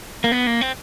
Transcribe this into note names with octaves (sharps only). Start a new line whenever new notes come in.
A#3
B3
A#3
C4